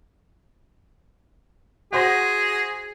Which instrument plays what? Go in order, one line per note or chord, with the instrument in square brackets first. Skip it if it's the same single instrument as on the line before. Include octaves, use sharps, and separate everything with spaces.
[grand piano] F#4 C5 A#6 [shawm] G#4